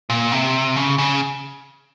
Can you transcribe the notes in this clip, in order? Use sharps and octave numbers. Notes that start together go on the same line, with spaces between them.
A#2
C3
C#3
C#3